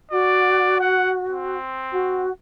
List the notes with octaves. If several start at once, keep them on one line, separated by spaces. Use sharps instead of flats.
F#4 D5
F#5
C4
F#4